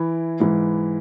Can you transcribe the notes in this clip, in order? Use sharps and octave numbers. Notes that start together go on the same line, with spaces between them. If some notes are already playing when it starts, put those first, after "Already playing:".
Already playing: E3 E4
G#2 E3